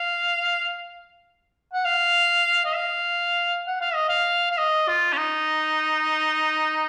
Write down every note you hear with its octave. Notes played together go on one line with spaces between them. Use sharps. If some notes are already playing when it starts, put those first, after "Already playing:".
Already playing: F5
F#5
F5
D#5
F5
F#5
F5
D#5
F5
F5
D#5
F4
C#4
D#4